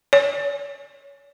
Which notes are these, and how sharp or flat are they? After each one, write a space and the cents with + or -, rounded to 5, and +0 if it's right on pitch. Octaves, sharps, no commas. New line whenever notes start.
C#5 +45